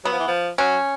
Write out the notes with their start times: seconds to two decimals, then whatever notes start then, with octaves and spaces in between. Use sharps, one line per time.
0.05 F#3 B3
0.12 F3
0.19 E3
0.28 F3
0.58 F#3 C#4